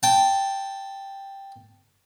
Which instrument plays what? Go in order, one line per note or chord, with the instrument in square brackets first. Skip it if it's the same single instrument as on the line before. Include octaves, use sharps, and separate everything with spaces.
[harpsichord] G5 A5